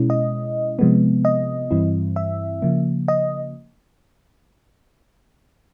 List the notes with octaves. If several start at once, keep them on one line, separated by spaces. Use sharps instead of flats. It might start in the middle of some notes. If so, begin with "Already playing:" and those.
Already playing: B2 G#3 C#4 E4
D#5
C3 F3 G#3 B3
D#5
G2 E3 G3 C4 E4
E5
C#3 F3 A#3
D#5